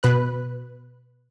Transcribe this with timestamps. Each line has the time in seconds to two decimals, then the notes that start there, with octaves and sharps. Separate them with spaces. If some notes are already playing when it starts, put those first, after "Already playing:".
0.03 B2 B4 F#6